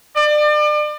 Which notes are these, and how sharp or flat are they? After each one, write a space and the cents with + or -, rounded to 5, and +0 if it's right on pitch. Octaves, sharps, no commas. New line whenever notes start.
D5 +35